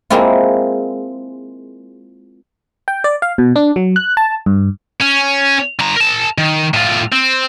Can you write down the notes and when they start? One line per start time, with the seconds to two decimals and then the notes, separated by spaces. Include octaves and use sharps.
0.10 G#3 A#3 C4 E4 F4
2.88 G5
3.04 D5
3.22 F5
3.38 B2
3.56 D4
3.76 F#3
3.96 F#6
4.17 A5
4.46 G2
5.00 C#4
5.79 D3 A#5
5.96 A#4 A5
6.38 D#3
6.74 A2 F4
7.12 C4